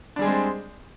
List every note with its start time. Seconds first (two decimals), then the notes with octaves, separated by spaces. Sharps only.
0.16 D4
0.19 G3
0.22 G#4
0.24 G#3
0.27 C4